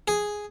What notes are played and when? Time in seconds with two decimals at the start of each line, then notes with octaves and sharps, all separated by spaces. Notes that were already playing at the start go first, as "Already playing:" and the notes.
0.08 G#4